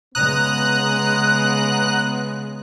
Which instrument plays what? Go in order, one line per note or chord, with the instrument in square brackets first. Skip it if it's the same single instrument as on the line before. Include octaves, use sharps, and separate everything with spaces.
[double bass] C#3 G#3 [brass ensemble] B3 [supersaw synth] A#5 D#6 [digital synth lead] F#6